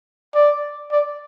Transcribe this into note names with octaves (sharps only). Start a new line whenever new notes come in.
D5
D5